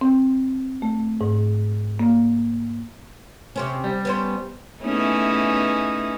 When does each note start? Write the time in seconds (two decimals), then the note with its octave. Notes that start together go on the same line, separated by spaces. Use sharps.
0.01 C4
0.82 A3
1.21 G#2
1.99 A#3
3.56 C3 C4 C#4
3.84 G3
4.05 B3 C#4 C5
4.82 A3 B3 C#4 D#4 E4 G#4